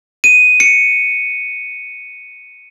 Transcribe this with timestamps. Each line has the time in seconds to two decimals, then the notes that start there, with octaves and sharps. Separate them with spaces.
0.24 D#7
0.60 C#7